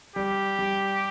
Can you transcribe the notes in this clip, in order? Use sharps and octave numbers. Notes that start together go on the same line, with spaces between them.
G3 G4
G3